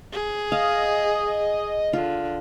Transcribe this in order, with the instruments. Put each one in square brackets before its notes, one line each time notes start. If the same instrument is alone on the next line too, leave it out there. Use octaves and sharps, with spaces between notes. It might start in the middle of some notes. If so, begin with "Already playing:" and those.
[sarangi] G#4
[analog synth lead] D#5 [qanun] F5
[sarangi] D3 [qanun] F4